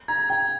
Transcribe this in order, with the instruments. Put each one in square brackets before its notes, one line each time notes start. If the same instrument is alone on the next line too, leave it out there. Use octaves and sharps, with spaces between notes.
[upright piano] A#5 [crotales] G#6
[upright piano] G5 [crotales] G#6